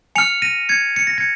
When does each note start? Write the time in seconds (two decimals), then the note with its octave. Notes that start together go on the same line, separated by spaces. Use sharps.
0.15 G#5 F6 C#7 F7
0.42 A#6 D#7
0.69 G#6 C#7
0.96 C#7
1.07 A#6
1.18 G#6 C#7